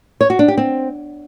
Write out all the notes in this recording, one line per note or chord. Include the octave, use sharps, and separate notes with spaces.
C#5
F#4
D4
G4
C4